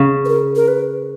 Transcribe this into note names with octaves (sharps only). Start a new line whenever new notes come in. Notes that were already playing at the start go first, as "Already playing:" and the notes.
Already playing: C#3
B4
A#4
A#4
B4